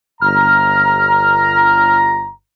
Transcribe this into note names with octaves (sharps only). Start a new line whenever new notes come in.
G1 A#5 F6